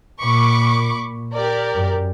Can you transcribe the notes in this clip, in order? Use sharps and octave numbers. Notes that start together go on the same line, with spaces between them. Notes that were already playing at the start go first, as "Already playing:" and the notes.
A#2 B5 C#6 D6
G4 A#4 D5
F#2